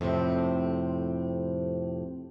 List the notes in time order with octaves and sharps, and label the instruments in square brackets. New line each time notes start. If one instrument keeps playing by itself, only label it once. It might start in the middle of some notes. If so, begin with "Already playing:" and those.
[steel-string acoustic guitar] F2 A2 C3 C4